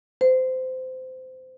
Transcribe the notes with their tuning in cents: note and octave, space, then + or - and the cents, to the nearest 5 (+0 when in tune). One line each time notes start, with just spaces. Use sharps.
C5 -20